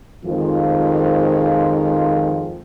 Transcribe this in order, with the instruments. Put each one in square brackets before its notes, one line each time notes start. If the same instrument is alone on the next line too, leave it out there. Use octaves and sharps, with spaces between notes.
[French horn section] F2 D#3 F3 G#3 F4